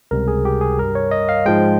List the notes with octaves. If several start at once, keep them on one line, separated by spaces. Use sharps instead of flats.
C#2 C3 G3 A#4
G#4
G4
G#4
G2 G3 A#4
C#5
D#5
F5
G#2 F3 G#3 G5